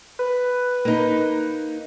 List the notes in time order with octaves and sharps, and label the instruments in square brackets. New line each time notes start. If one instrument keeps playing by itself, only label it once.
[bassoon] B4
[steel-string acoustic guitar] A#3 D#4